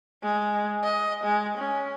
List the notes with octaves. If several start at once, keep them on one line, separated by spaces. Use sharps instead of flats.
G#3
D#5
G#3
C#4